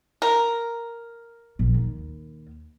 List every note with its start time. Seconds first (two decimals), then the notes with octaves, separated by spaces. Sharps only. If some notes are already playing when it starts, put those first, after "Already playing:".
0.22 A#4
1.59 A#1
1.74 D#2